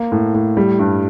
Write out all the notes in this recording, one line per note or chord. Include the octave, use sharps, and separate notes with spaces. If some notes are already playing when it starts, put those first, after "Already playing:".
Already playing: A#3
A2
A2
G3
G2